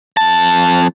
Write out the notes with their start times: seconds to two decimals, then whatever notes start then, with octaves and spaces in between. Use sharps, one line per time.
0.17 F2 A5